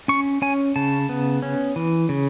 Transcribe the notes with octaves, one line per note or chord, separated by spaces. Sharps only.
C#4 C#6
C#4 G#5
C#3 A5
B3
C#4
E3
C#3